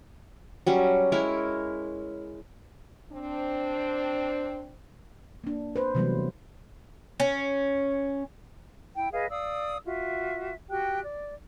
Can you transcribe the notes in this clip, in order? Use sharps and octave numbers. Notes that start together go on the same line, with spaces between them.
F#3 G3 C#4
G#3 E4 A#4 C#5
C4 D4
A#3 D4
B4 C5
C3 E3 F#3 G3 A3 B3
C#4
E4 G5
G#4 B4 D#5 F5
D5 F5 D#6 E6
F4 F#4 E5
F#4 G4 G5 F#6
D5